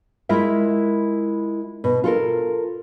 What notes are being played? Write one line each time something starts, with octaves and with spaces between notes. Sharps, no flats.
G#3 E4 F4 A#4 E5
B2
F4 A4 A#4